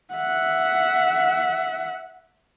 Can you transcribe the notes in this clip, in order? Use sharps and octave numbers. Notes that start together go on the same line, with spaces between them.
E5 F#5